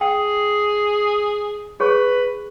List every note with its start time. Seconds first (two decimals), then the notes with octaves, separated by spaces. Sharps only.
0.01 G#4 G5
1.80 G#4 B4 C#5 C#6